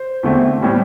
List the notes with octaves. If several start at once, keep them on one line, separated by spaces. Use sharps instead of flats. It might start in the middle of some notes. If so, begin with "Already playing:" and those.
Already playing: C5
E2 D3 A3 C4
A2 G3 C4